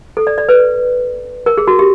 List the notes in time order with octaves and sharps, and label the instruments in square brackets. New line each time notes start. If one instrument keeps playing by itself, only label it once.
[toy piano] A4
D5
D5
B4
A#4
G#4
F#4
G4